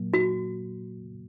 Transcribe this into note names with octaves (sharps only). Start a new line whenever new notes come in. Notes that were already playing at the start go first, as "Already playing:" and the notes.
Already playing: A#2 F#3 A#3
F#4